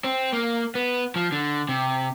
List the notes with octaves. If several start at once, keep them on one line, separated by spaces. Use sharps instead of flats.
C4
A#3
B3
F3
D3
C3